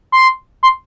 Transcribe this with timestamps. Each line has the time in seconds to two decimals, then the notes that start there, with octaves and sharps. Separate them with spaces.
0.12 C6
0.63 C6